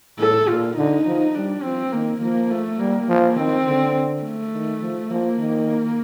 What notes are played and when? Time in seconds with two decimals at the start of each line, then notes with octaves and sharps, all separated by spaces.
0.19 A2 A4
0.48 A#2 F4
0.77 D3 D#4
1.05 F3
1.35 G3 D4
1.63 F3 C4
1.93 D#3 A#3
2.21 F3 A#3
2.51 A3
2.79 G3 A#3
3.09 F3
3.36 D#3 C4
3.66 D3
4.23 A3
4.53 D#3
4.81 F3
5.10 F3 A#3
5.39 D#3